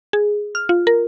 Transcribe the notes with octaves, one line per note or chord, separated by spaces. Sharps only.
G#4
F6
F4
A#4